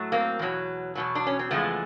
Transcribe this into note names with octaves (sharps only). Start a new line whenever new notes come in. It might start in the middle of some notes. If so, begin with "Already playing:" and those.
Already playing: A2 F#3 A3
A#3 C4
E2 B2 F#3
E2 B2 F#3
D4
C#4
C4
E2 C#3 F3 G#3 A3 B3